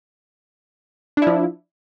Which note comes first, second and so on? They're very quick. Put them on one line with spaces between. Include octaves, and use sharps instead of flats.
D4 E4 F3